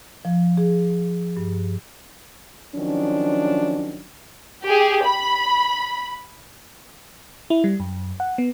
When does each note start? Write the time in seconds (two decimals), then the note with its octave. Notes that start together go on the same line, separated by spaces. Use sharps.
0.25 F3
0.57 G#4
1.37 G2
2.74 D#3 F3 F#3 C#4 D4
4.67 G4 G#4
5.05 B5
7.50 E4
7.64 G3
7.80 F#2
8.20 F#5
8.38 B3